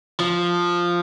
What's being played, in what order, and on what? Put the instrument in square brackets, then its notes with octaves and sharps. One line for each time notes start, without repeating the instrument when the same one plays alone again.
[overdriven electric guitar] F3